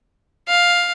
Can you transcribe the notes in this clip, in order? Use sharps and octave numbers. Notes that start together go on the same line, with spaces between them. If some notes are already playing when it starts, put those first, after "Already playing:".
F5